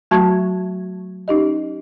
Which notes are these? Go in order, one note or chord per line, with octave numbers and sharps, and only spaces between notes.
F#3 A3 F#4 A5 C#6 G#6
C#4 D#4 G4 D#5